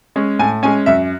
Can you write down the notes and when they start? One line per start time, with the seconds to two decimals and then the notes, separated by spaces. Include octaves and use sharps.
0.16 G#3 C#4
0.39 A2 G#5
0.63 G#3 C#4 G#5
0.86 F#2 E5